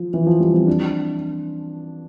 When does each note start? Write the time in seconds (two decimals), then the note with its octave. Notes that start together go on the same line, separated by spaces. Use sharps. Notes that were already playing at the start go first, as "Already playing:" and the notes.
Already playing: F3
0.14 E3
0.27 F3
0.40 G3
0.54 C4
0.67 D4